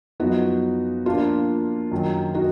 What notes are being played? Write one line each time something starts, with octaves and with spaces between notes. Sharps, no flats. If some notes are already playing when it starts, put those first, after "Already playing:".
F#2 F3 B3 D#4 F#4
A#2 F3 A#3 D4 F4
F#2 D#3 F#3
D#4 F#4